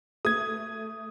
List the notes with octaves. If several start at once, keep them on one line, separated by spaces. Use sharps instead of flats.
A3 D#6 G#6